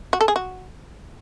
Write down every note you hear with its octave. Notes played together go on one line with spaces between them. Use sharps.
F#4
A4
G#4
F#4